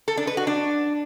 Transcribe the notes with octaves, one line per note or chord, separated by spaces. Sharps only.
A4
D4
B4
F#4
D4